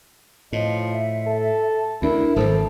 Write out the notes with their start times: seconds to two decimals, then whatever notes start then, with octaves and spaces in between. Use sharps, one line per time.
0.53 A2 F3 D#5
0.92 E5
1.27 A4
2.02 D2 D4 E4 A#4
2.36 D#1 G#1 A4 C5